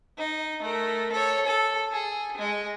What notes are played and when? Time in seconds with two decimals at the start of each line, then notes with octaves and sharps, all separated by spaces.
0.18 D#4
0.62 A3 A#4
1.12 A4 C#5
1.45 A4
1.92 G#4
2.37 G#3 G#4